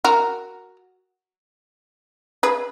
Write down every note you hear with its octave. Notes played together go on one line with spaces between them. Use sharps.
F#4 A#4
G#4 B4